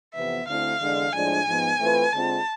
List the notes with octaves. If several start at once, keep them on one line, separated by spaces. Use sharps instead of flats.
F2 C3 E3 B3 E5
D2 D3 A3 C4 E4 F5
E2 D3 G#3 D4
A2 F3 G#3 D4 G#5
G#2 F3 B3
E3 A3 C4 F4 B4
D3 G#3 C4 F4 A5